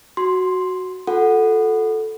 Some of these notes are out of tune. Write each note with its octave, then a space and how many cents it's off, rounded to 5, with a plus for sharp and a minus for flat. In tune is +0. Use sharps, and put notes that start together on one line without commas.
F#4 +0 C6 +0
F4 +45 A4 -5 F#5 +0